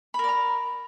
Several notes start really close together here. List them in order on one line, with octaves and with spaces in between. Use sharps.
B5 A#4 D5 A#5